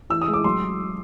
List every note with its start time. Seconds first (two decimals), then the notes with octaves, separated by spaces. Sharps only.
0.10 E3 E6
0.21 D#6
0.28 G#3
0.33 D6
0.44 F#3 C6